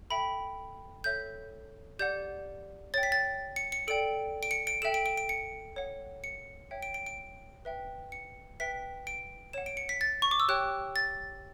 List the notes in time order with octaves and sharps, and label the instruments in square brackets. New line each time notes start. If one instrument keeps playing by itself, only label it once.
[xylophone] A4 E5 G5 B5
A4 C#5 E5 G6
G4 D5 F#5 G6
C#5 G5 A6
B6
A6
C#7
C#7
A4 D5 G5 D7
D7
C#7
D7
A4 E5 G5 E7
D7
D7
D7
C#7
C#5 F#5
C#7
C#5 E5 G5
D7
D7
D7
B4 E5 G5
C#7
B4 E5 G5 B6
D7
C#5 F#5 E7
D7
C#7
B6
A6
C#6
D6
E6
G4 C#5 G5 F#6
A6